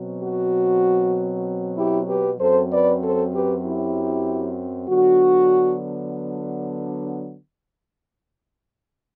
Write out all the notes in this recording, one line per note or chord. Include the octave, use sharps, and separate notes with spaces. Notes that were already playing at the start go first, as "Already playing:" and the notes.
Already playing: B2 F#3 C4
F#4
E4 G4
G4 B4
F#2 F#3 C4 A4 C5
B4 D5
A4 C5
G4 B4
E4 G4
D3 F#3 B3 D4 F#4